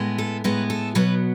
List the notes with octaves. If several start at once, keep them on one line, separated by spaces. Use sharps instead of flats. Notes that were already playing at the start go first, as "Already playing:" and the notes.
Already playing: A2 G#3 B3
A4
A2 G#3 B3 B4
A4
B2 F#3 B3 B4